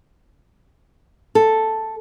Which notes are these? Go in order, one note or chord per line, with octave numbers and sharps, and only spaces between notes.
A4